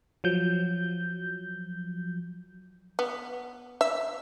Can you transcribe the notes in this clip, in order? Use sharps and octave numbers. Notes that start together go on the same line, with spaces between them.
F3 F#3 G6
B3
E5